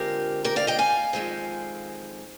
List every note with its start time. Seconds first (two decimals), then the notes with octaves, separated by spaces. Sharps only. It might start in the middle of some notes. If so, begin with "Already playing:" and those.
Already playing: D3 G#3 C4 F4 G4 A#4
0.44 G4 A#4
0.56 D5 F5
0.67 D#5 G5
0.79 F5 G#5
1.13 F2 D#3 G#3 C4